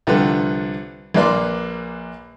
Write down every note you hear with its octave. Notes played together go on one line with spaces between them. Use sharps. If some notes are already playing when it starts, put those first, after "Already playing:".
C2 D3 F3 B4
A#1 A#3 B4 D5 C6 D6